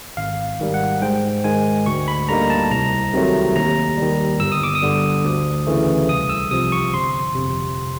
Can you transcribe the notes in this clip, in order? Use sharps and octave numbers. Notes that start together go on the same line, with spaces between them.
G#1 F5
G#2 D#3 G3
F#5
G#2 G5
D#3 G#3 G#5
D2 C#6
B5
D3 G3 A#3 D#4 A#5
A5
C2 A#5
C3 D#3 F#3 A3
D#2 A#5
D#3 G3
G1 E6
D#6
D6
D#6
G2 D3 G3
D2
C#3 E3 A3
C2 D#6
E6
C3 F3 D#6
C#6
G1 C6
F2 C3